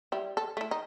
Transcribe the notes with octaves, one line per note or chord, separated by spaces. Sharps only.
G3 E4
A4
A3 E4
D#4